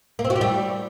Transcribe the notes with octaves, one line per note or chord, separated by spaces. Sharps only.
A#3
C4
F#4
G4
G3